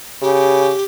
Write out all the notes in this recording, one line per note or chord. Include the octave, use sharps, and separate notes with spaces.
C#3 G4